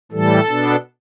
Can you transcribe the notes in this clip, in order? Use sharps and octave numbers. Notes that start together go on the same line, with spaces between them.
A2 E3 G3 A4
B2 B3 D4